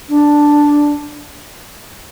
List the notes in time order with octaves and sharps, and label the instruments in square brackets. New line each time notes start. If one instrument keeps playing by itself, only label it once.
[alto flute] D4